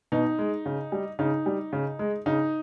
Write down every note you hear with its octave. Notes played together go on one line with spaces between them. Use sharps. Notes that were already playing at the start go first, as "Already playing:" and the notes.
B2 D#4
G#3
C#3
G3
C#3 D#4
G3
C#3
G#3
C#3 D#4